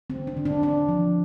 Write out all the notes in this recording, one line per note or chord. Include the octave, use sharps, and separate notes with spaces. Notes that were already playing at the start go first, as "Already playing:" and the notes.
D3 C4
D4
D3
D4
D3 D4
F3